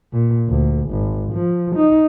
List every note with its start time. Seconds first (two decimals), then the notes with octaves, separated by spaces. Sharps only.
0.13 A#2
0.50 D2
0.90 G#1
1.33 F3
1.76 D#4